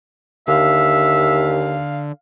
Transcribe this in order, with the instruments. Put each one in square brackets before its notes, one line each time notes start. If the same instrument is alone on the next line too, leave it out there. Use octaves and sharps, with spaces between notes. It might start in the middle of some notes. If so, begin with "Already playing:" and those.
[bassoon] D#2 [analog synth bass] D3 [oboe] E5 [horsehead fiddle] F5